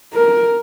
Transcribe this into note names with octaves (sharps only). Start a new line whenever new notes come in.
A#4